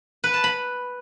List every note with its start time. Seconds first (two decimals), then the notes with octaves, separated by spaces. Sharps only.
0.24 B4
0.34 A5
0.44 B5